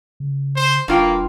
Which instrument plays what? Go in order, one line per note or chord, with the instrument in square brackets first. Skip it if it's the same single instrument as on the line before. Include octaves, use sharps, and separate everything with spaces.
[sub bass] C#3
[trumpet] C5
[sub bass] E1 [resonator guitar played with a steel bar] G2 F4 G5 [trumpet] A#3